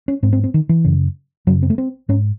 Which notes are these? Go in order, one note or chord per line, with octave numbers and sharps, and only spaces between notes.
C#4
G#2 C4
C4
C4
D#3
E3
F#2 C#3
F#2 C#3 F#3
C4
A3
C4
G#2 C#4